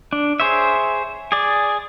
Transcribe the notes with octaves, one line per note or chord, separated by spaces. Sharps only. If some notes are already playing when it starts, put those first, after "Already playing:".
D4
G#4 C5 C#5 E5
G#4 D5